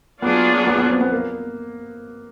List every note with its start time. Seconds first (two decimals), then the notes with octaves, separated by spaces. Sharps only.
0.22 F#3 A#3 B3 D4 F4 G#4
0.67 B3
0.78 B3
0.90 C4
1.01 B3
1.12 A#3